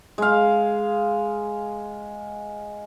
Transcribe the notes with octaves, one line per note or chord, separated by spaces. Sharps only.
G#3 F5